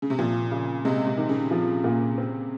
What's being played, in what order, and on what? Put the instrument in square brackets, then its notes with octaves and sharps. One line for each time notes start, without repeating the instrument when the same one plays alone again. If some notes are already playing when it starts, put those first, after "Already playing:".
[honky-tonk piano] C#3
C3
[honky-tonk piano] A#2 [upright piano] F3
[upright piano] C#3
[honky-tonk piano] C3 [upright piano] G#3
[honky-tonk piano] C3
[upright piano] D#3
[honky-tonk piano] C#3
[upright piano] F3
A#2
C4